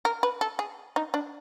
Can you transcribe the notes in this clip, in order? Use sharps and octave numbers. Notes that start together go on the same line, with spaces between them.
A#4
B4
A4
G#4
D#4
D4